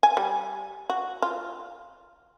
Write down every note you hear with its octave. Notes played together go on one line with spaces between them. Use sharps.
G#5
G3
F#4
F4